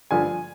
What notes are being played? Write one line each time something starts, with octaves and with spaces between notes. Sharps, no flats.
G2 D3 F3 G#5